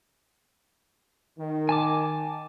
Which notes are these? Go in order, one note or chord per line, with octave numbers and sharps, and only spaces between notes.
D#3
G#5 A5 D6